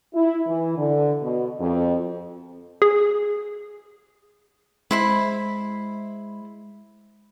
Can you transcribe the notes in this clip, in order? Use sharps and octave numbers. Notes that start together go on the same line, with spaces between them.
E4
E3
D3
B2
F2
G#4
G#3 E4 C5 B5